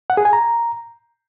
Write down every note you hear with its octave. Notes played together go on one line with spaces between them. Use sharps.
F#5
G#4
G#5
A#5